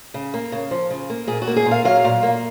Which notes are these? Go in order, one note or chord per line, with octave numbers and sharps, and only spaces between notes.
C#3
A#3
C#3
F3
C#3
A#3
A#2 G#4
F#4
A#3
G#4
A#2
F5
F#3 F5
A#2
A#3